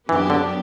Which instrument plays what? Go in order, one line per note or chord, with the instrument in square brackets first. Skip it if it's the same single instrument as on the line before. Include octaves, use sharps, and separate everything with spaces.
[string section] F#2 F#3 B3 D4 G4 [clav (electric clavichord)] E3
[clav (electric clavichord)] D3